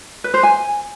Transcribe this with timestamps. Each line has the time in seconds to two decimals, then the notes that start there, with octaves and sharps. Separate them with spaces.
0.24 B4
0.34 C5
0.43 G#5